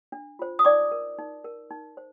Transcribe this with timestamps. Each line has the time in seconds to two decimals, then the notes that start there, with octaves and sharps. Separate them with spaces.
0.12 D4
0.39 F4 C5
0.59 D#6
0.65 D#4 D5 D6
0.92 A#4
1.18 D#4
1.44 A#4
1.71 D#4
1.97 C5